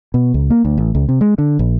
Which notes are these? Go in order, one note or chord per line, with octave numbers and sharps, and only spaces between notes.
B2
C#2
A#3
D2
A1
C#2
C3
G#3
D3
A#1